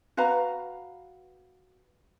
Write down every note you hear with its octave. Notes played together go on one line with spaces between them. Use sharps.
F#4 B4 F5 A#5